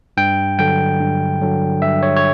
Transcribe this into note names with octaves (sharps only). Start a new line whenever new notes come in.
G2 G5
D3 F#3 G5
G2
D3 F#3
G2 E5
C#5
C#5